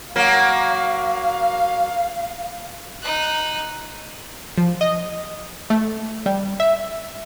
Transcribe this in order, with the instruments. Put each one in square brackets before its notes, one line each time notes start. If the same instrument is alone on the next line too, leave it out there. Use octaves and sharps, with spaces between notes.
[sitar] F#3 A#3 [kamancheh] F5
[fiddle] D#4 F#6
[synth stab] F3
D#5
A3
G3
E5